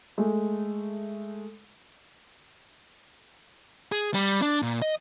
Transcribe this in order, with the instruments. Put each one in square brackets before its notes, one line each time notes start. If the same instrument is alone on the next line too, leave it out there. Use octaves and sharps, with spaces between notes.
[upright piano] G#3 A3
[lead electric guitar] G#4
G3
D4
A#2
D#5